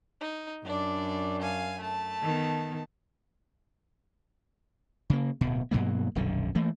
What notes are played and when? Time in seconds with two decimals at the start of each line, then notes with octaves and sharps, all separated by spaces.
0.21 D#4
0.65 F#2 D4 D5
1.41 F5 G#5
1.79 A3 A5
2.22 D#3 B3
5.10 C#3 A#3
5.41 D1 B2
5.71 G2 B2 F#3 A#3
6.15 D#1 B1 F#2 D3
6.55 E3 A3 A#3